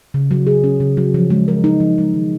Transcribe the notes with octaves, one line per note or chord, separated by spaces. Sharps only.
C#3
F#3
G#4
C#4
C#3
F#3
F3
G#3
A#4
D#4
F3
G#3
D#3